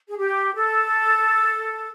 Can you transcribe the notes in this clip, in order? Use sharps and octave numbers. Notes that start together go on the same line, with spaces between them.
G#4
G4
A4